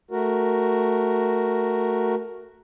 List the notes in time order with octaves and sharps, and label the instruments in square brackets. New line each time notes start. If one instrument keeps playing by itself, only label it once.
[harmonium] A3 F#4 A#4